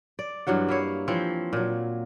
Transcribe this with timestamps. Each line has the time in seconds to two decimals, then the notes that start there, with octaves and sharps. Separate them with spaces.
0.19 D5
0.47 G2 E3 F#3 F#5
0.68 A#3 E4 C#5
1.08 E3 F3 C4 C#5
1.53 A#2 F#3